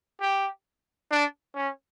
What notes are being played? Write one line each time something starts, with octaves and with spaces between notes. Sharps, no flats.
G4
D4
C#4